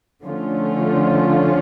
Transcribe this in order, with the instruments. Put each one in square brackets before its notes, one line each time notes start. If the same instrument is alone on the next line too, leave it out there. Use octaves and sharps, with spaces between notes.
[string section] D3 F3 A3 C#4 F4